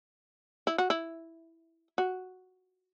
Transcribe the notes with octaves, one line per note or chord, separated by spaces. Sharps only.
E4
F#4
E4
F#4